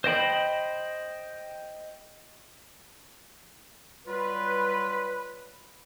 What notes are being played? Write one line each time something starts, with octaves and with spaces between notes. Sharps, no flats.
C5 D#5 G5 B5
F#3 G3 F4 B4